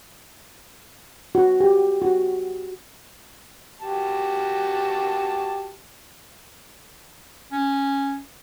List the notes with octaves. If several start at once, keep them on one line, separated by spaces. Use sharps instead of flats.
F#4
G4
F#4
F#4 G4 A5
C#4